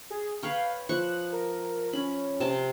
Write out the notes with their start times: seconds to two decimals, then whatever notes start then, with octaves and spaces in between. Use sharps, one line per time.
0.10 G#4
0.43 B4 C#5 F5 G5
0.89 F3 C#6 F#6
1.33 A#4
1.93 C#4 B5
2.40 C3 A5